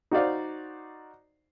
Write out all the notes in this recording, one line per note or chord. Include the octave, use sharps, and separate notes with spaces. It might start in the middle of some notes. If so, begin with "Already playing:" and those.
D#4 F#4 C5 D5 F5